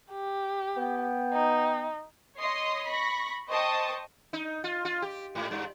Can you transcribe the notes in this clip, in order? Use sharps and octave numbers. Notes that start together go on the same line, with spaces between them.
G4
B3 G5
D#4
C#5 D#5 C6 D#6 C7
B5 C#6 A#6
C5 D#5 G5 A5 C#6 D#6
D#4
F4
F4
G4
G#2
G2